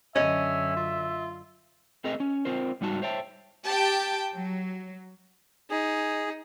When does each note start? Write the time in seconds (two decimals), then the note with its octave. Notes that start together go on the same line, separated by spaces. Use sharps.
0.16 F#2 D3 C#4 D#5 E5
0.76 F4
2.04 A3 C4 G#4 A#4 D#5
2.20 C#4
2.45 C4 F4 A#4 C5
2.81 G#2 G3 D#4 F#4 A5
3.02 C5 C#5 E5 G5 A5
3.66 G4 G5 A5
4.33 F#3
5.70 D#4 G#4